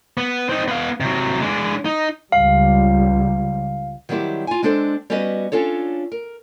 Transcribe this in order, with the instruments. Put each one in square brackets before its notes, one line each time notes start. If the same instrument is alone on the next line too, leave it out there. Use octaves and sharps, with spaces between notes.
[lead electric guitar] B3
C4 D#4
B3 F5
C3 F#3
G#3 D4
D#4
[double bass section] C#2 G3 [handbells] F5
[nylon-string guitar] D#3 F#3 G3 C4 E4 G4
F4 G#5
G#3 C4 D4 A4 C5
G3 B3 C#4 F#4 B4 D#5
C#4 D4 F4 A4 C#5
A#4